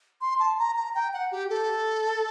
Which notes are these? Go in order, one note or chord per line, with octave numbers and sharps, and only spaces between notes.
C6
A5
A#5
A#5
G5
F#5
G4
A4